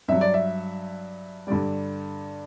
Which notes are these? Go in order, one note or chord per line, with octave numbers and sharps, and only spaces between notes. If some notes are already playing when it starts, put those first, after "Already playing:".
G2 F#3 E5
D5
E5
G2 D3 G3 D5